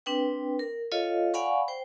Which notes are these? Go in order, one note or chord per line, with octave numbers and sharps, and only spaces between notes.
C4 D4 B4 G5
A#4
F4 A4 C#5 D#5 F5
D5 F5 F#5 G#5 B5 C#6
C5 G5